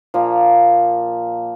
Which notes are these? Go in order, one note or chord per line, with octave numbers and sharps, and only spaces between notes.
A#2 F3 A#3